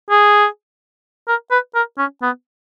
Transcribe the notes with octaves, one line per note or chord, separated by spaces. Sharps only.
G#4
A#4
B4
A#4
C#4
B3